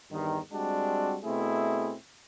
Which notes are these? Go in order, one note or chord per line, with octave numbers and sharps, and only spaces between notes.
E2 G2 D#3
G3 G#3 C4 D4 F#4
B2 A3 C4 E4 G#4